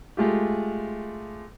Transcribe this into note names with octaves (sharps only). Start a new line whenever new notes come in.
G#3 A3 F4 G4